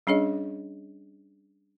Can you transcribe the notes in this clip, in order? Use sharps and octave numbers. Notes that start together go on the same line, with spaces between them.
G3 C#4 D4 G#4 C#5 D#5